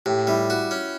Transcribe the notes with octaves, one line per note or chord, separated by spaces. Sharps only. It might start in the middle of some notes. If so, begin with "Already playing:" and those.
A2 G4
G3 E4
F#4
C#4